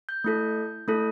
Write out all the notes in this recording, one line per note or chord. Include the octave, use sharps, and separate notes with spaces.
G6
A3 E4 A4
A3 E4 A4